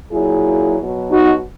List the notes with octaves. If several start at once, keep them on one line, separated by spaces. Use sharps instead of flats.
A#2 F#3 E4 G#4
B2 F#3
D#4 F#4